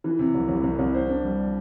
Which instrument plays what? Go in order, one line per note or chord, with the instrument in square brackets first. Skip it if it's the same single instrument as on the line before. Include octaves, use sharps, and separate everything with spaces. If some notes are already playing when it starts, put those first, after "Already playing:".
[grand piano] E3
C3
C2
C2
C2
C2
C5
D4
G3